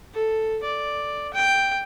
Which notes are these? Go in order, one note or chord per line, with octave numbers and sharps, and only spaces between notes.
A4
D5
G5